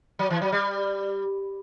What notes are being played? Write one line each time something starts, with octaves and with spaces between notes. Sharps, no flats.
F#3
E3
F#3
G3